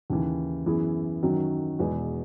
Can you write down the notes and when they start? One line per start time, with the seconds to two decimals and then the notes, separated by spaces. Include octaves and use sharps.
0.10 D#2 C#3 E3
0.66 F#2 E3 B3 E4 G#4
1.23 F#2 D#3 F#3 C#4 F#4
1.79 E2 B2 G#3 B3 F#4